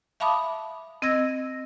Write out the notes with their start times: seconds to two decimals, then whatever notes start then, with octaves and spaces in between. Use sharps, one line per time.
0.20 E5 F5 A5 B5 D6 D#6
1.02 C4 D#5 E6 G#6 A#6